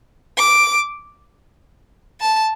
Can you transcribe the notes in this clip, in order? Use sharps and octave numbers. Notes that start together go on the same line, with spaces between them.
D6
A5